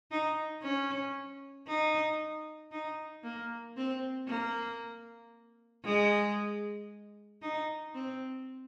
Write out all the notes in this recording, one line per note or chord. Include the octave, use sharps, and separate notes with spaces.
D#4
C#4
D#4
D#4
A#3
C4
A#3
G#3
D#4
C4